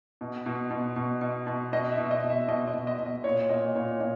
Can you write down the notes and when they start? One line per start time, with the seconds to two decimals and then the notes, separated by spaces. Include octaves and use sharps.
0.21 B2
0.46 B2
0.71 B2
0.96 B2
1.21 B2
1.47 B2
1.73 B2 D#5
1.92 E5
1.98 B2
2.11 D#5
2.24 B2
2.30 E5
2.48 B2 D#5
2.68 D#5
2.74 B2
2.87 D#5
2.99 B2
3.06 D#5
3.24 A#2 C#5
3.49 A#2 D#5
3.75 A#2 C#5
4.00 A#2 D#5